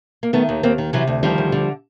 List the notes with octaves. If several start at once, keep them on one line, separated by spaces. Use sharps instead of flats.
A#3
D#3 A3 B3
D#2
D#2 A#3 C4
D#3
C3 E3 F#3
D2
D#3 F3 G3
D2
D3